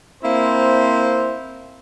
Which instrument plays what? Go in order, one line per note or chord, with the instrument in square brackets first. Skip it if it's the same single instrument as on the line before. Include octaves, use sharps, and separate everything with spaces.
[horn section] A#3 C4 E4 C5